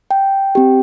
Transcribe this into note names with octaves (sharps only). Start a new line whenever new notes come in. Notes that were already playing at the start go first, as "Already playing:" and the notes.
G5
C4 G4